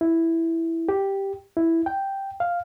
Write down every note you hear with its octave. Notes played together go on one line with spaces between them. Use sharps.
E4
G4
E4
G5
F5